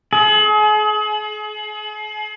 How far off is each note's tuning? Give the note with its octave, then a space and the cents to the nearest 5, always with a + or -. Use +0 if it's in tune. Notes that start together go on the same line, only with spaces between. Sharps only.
G#4 +40